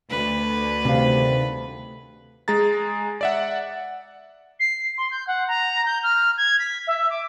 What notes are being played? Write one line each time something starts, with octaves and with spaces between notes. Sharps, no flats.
D2 B4
C3 D#3 G3 C4 F5
G#3 G#4 A#5 A6
D5 E5 F#5
C7
C6
G6
F#5
A#5
G6
F6
G#6
B6
E5
D6